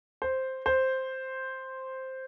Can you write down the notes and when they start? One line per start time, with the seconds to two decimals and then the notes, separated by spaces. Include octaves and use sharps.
0.22 C5
0.66 C5